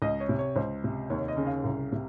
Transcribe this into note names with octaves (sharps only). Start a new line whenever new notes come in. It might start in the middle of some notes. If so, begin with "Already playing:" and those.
C#2 D#5
C#5
C3
C#5
C#2 C5
C3
D#2 C#5
D#5
C#3
F5
C2
C3